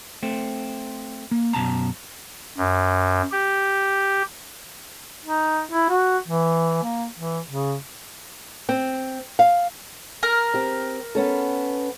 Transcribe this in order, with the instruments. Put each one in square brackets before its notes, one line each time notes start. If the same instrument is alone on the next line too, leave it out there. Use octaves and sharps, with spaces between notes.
[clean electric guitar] A3 C4
A#3
F#2 B2 A5 A#5
[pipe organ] F#2
G4
[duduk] D#4
E4
F#4
E3
A#3
E3
C#3
[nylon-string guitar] C4
F5
[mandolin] A#4
[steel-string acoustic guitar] C4 G4
B3 C#4 A4